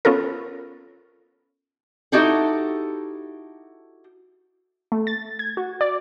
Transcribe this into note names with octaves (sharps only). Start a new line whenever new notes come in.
B3 C#4 F4 A4 A#4
D#4 E4 F#4 G4 A4
A3
A6
G#6
F#4
D5